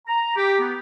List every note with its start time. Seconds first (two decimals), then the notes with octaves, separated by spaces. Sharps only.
0.08 A#5
0.36 G4
0.60 B3